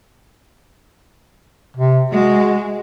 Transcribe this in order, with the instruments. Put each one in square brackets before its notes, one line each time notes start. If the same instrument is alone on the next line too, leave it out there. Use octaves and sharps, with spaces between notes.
[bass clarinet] C3
[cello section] G#3 [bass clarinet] F#4